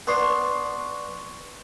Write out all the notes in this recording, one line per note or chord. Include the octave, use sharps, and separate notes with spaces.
B3 D4 C6 C#6 C7